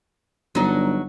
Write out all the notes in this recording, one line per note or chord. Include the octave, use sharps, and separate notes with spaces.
G1 F#3 D4 D#4